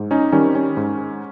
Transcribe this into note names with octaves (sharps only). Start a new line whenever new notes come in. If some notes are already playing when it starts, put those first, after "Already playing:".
Already playing: G#2
C#4 D#4
D#3 G3 C#4
C4
C#4
G#2